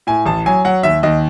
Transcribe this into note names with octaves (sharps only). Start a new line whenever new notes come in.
A2 G#5
A1 A5
F#3 G#5
F#3 F#5
D#2 E5
D#2 D#5